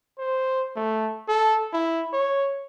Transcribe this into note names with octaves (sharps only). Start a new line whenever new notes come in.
C5
A3
A4
E4
C#5